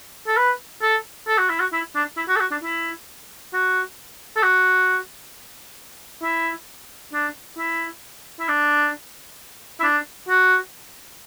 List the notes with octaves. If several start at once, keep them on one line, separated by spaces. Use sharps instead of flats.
A4
B4
A4
A4
F#4
E4
F#4
E4
D4
E4
F#4
A4
F#4
D4
E4
F#4
A4
F#4
E4
D4
E4
E4
D4
E4
D4
F#4